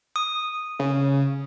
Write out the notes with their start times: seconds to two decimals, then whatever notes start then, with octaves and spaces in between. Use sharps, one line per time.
0.16 D#6
0.79 C#3